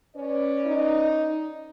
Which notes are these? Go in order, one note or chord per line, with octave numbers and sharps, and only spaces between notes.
C#4 B4 D5
D#4